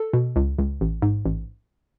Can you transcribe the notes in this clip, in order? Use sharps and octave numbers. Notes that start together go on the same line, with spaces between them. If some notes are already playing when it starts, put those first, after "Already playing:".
Already playing: A4
B2
C#2
C#2
A1
G#2
A1